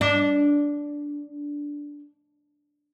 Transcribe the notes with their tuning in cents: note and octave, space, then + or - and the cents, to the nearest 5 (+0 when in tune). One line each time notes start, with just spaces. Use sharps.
D4 -10